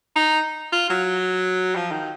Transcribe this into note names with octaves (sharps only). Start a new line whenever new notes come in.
D#4
F4
F#3
F3
D#3